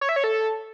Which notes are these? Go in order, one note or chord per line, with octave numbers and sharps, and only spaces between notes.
C#5
E5
C#5
A4